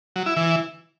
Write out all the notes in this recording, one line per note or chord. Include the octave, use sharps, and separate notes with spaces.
F#3
E4
E3